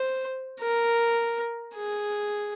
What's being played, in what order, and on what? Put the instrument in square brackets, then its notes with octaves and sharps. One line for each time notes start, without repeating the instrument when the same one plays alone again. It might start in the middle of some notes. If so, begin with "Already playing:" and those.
Already playing: [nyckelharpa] C5
A#4
G#4